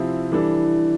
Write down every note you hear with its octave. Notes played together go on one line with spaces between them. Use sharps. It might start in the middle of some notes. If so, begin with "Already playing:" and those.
Already playing: C3 F3 C4 E4
E3 G3 D4 A4